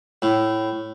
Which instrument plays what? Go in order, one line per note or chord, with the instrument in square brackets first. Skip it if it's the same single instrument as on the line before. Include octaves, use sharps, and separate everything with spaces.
[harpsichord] A2